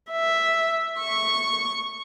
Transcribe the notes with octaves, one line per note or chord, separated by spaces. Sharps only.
E5
C#6